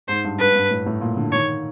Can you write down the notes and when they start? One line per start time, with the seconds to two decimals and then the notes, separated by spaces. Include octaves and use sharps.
0.08 G#2 C5
0.24 G2
0.39 G2 B4
0.55 G2
0.70 A2
0.86 A2
1.01 A#2
1.17 D3
1.32 D#3 C#5